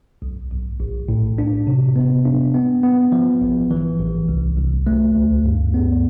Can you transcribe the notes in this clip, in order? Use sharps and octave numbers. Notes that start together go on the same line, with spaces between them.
B1
B1
A1
A2
D4
C3
B3
D4
B3
B3
F3
A1
E3
A1
C2
C2
A3
D2
G2
B3